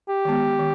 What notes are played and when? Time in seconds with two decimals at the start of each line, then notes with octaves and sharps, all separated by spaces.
0.08 G4
0.25 D#3 G#3 B3
0.59 D#3